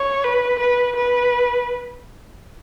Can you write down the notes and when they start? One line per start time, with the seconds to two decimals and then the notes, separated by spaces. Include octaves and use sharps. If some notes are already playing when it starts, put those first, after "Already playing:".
Already playing: C#5
0.24 B4
0.59 B4
0.96 B4